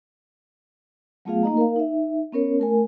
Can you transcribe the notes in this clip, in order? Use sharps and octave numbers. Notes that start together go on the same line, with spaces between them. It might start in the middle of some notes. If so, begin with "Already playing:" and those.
F#3 A3 B3 F4 G#4 F5
A#3 D#4 D#5 A#5
A#4 F5
D#4 E5
B3 C#4 A#4 C#5
A3 A#4 G#5